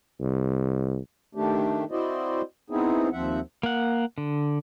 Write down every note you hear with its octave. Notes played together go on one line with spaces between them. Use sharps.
C2
D#3 A3 D4 G4
C4 E4 F#4 C5 D5 D#5
B3 C4 D#4 E4 G#4
D#2 F3 C4 E5 F#5
A#3 F#5
D3